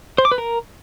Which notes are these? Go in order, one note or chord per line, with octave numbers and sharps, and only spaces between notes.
C5
D6
B4
A#4